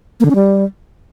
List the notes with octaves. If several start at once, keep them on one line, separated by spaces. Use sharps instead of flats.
A#3
D3
C#4
G3